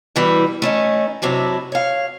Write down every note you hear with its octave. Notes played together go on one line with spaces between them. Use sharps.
B2 E3 G3
A3 C#4 D#4
F#2 C3 F#3 D4 E4
C#5 F5